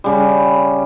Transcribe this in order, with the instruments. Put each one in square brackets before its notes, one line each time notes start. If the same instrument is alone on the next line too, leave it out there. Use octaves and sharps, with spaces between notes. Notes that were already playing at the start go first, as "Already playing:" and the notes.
[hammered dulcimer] C#3 G3